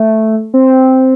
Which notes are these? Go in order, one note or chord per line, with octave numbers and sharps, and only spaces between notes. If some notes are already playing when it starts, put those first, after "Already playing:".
Already playing: A3
C4